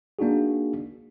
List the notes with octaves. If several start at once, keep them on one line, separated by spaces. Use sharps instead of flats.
A#3 D4 D#4 F#4 G#4